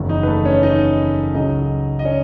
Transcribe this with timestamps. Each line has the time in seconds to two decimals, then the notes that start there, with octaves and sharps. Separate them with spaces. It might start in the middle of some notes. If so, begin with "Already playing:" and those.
Already playing: F#1 E2 D#3 F#3
0.09 D#4
0.23 B4
0.27 A3 A4
0.45 C#4 C#5
0.63 D#4 D#5
1.34 C#2 C#3 F#3 D#4 D#5
1.99 D#5
2.05 C#4 C#5